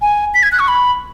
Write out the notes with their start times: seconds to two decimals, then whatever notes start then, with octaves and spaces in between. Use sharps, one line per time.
0.02 G#5
0.34 B6
0.43 G#6
0.52 F#6
0.59 C#6
0.68 B5